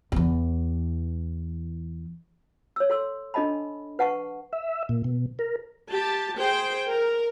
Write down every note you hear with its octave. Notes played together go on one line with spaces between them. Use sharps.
E2 E3
C#5 E6
A4 C6 E6
D4 A4 D#5 A5 B5
B4 F#5 A5 C#6
E5
A#2
B2
A#4
G4 A5
G#4 C5 G5
A#4